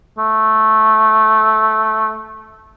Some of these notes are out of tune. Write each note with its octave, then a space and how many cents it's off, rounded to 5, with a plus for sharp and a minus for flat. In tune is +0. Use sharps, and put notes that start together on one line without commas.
A3 -10